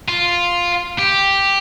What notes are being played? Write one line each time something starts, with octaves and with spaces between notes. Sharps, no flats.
F4
G4